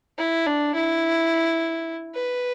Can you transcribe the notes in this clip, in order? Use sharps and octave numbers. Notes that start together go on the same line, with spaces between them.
E4
D4
E4
B4